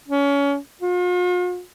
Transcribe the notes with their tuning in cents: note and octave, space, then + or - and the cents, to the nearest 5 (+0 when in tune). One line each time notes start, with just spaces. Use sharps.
C#4 +25
F4 +45